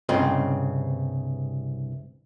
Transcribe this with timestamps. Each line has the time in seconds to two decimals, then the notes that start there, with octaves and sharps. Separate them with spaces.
0.09 C2 G2 C#3 C4 D#5